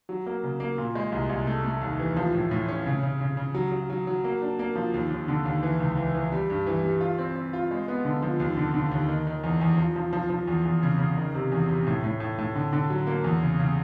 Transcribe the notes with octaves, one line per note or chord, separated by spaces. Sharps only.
F#3
A#3
C#3
A#3
A#2
G#3
C2
C2
A3
A3
D#2
E3
F3
A2
A2
C#4
C#3
C#3
C#3
C#3
F#3
F#3
F#3
F#3
A#3
D4
A#3
F3
D#2
D#2
D3
D#2
E3
C#2
E3
E3
G3
G2
E3
G3
F4
C4
C4
F4
G#3
B3
D3
F3
D#2
D3
D3
D#2
D#3
D#3
E2
E2
F3
F3
F3
F3
E2
E2
C#3
C#3
D#3
C3
E2
C3
A2
A2
A2
A2
D3
D3
F#3
A#3
E2
C#3
C#3